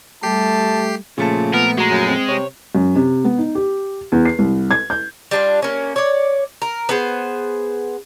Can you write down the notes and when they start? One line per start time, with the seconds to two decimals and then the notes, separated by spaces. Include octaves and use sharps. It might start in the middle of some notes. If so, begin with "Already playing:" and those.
0.23 G3 A3 G4 A5 C7
1.18 A#2 C#3 F3 A3 F4 A5
1.53 B3 A#4
1.78 G#3 F#4 A#5
1.90 F#2
2.09 C4
2.29 C3 C#5
2.75 F#2
2.96 C3
3.24 B3
3.38 D#4
3.55 G4
4.12 E2
4.25 C7
4.39 C2
4.71 G#6
4.90 G6
5.31 G3 D4 F4
5.62 A#3 C#4
5.96 C#5 D5
6.62 A#4
6.89 B3 G#4 C5